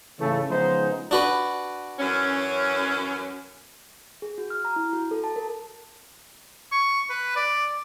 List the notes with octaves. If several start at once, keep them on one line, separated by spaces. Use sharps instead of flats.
G#2 C#3 E3 A3
C#3 F3 G#3 B3 D#4 C5
D4 F#4 B4
F#2 E3 C#4
G#4
F#4
F6
A#5
E4
F#4
A4
A5
A#4
C#6
B4
D5